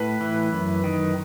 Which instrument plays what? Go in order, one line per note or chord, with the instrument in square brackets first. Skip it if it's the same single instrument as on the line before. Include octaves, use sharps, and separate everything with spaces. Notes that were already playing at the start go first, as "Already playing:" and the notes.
Already playing: [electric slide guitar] A2 [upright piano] B4
[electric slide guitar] E3
F#2
D#3